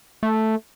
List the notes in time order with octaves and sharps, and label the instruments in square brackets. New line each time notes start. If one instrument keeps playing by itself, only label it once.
[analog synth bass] A3